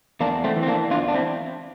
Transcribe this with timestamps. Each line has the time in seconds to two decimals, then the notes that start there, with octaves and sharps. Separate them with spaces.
0.20 E2 A#3 D4
0.44 A3 C4
0.56 E3
0.63 C4
0.68 A#3 D4
0.91 E2 D4 F4
1.08 D4
1.14 C4 E4